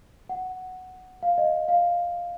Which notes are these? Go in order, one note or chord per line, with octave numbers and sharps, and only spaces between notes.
F#5
F5
D#5
F5